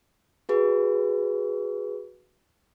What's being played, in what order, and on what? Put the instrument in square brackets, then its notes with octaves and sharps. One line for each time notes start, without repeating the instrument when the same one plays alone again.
[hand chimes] F#4 G#4 B4